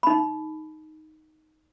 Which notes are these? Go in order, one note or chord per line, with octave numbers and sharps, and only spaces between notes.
D#4 B5